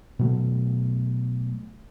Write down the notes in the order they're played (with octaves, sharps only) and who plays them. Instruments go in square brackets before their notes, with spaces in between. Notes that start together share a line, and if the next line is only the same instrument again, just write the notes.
[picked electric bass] B2 F#3 A3